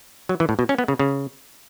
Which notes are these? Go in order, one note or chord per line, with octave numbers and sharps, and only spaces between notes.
F#3
E3
A2
B2
C#4
B3
C#3
C#3